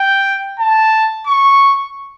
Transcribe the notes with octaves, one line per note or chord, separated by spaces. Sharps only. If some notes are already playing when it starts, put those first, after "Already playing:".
Already playing: G5
A5
C#6